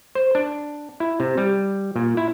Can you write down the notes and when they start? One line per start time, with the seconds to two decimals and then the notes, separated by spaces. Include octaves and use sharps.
0.15 C5
0.35 D4
1.00 E4
1.20 C3
1.37 G3
1.96 A#2
2.17 E4